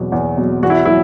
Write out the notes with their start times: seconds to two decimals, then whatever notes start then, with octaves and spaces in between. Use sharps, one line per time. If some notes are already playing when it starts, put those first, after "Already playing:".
Already playing: E2 B2 F#3
0.12 E2
0.37 B2 F#3
0.63 E2 F#4
0.70 E4
0.85 F#3 E4